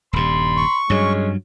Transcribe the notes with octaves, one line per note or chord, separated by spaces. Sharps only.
D#1 G2 B5 C6
C#6
G2 F#3 G#3 C#4